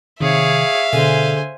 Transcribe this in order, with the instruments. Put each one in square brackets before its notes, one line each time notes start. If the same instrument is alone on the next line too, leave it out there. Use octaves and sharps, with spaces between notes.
[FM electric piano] C3 D#3 [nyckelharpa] G#4 C#5 [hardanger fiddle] E5 F5
[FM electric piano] B2 [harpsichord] D3 G#4 [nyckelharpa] C5 G#5